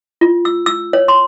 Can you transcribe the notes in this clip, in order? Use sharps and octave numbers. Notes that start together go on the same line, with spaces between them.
F4
E6
E6
C#5
C6